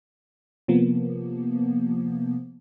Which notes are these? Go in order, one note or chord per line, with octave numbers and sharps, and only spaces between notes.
C3 F3 A#3 B3